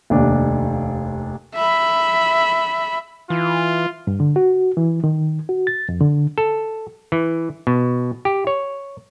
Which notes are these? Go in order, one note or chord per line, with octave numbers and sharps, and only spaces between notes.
F1 D#2 D4
E5 B5
E3 F4
G2
D3
F#4
E3
D#3
F#4
A6
F2
D3
A4
E3
B2
G4
C#5